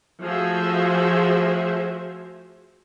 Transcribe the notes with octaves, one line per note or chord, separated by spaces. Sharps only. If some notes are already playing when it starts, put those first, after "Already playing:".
F3 A3 F#4 G#4 C5 E5